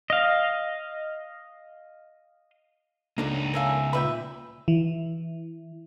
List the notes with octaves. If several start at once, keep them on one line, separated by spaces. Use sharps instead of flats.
D#5 F5
C#2 A#3 D4 D#4 A4
A4 A#4 E5 F5 G#5
A#2 B4 E5 G5 B5
E3